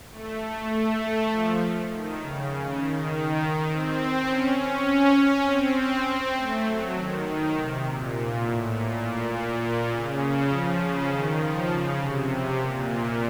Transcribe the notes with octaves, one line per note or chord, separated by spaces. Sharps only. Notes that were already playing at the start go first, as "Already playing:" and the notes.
A3
A3
A3
F3
D#3
C#3
C#3
D#3
C4
C#4
C#4
C#4
C4
C4
A3
F#3
D#3
C3
A#2
A2
A#2
A#2
A#2
C#3
F3
C#3
D#3
F3
C#3
C3
A#2